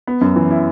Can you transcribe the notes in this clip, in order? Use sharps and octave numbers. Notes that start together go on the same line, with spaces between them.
B3
F#2
E3
E4